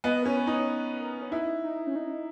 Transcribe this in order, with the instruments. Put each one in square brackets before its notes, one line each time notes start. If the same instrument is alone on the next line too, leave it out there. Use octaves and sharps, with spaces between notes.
[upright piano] B3 [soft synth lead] D#5
[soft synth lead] A#4
[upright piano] C#4 [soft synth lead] B4
[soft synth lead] C#5
[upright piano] D#4
[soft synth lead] B4
A#4
C#4
[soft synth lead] D#4 [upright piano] E4
[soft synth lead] D#4
C#4
D#4